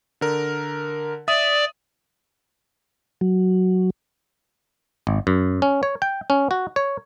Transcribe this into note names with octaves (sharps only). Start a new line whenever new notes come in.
D3 A#4
D5 E5 D#6
F#3
G#1
F#2
C#4
C#5
G5
C#4
F#4
C#5